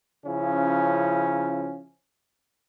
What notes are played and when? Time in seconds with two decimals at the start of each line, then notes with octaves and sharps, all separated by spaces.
0.25 C#3 F3 C#4 E4